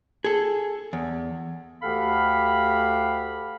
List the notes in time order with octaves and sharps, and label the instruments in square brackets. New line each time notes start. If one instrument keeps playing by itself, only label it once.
[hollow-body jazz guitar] G#4 A4
E2
[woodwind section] D2 G4 A4 F5 F#5 B5